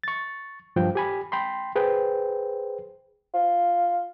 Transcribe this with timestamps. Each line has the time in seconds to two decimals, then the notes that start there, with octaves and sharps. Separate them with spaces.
0.04 C#6 A6
0.76 G2 F3 G5
0.95 G4 G#5 B5
1.32 G5 B5 C6
1.76 G#4 B4 C5 G5
3.34 F4